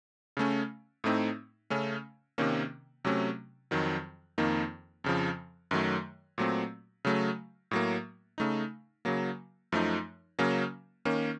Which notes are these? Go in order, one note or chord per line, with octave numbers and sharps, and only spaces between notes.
C#3 A3 C#4
A2 A3 C4 D#4
C#3 A3 C#4
C3 D#3 A#3 C#4
C3 F#3 A3 C#4
F2 D#3 F#3
F2 D#3 A#3 D#4
F2 C#3 F3
F#2 D#3 F#3 A3
A#2 F#3 A3 C4
C#3 F#3 A3
A2 F#3 A#3
C#3 A3 D#4
C#3 F#3 A#3
F#2 F3 A3 D#4
C#3 F#3 A#3 C#4
D#3 A#3 C#4